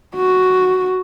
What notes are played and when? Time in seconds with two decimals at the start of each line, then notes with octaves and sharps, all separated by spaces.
0.16 F#4